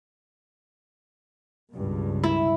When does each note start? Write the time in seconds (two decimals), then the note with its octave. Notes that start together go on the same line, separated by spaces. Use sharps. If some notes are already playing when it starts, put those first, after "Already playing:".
1.71 C#2 G2 B2
2.24 E4